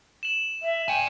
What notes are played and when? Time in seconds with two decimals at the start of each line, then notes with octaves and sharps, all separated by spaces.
0.23 E7 F#7
0.63 E5
0.88 D5 G5 G#5